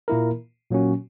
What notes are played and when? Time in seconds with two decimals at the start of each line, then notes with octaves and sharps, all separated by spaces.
0.08 A#2 A#3 E4 A#4
0.71 A#2 F#3 A#3 C#4 F#4